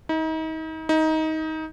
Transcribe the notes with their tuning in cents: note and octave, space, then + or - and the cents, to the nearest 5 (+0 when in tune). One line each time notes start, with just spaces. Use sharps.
D#4 +35
D#4 +20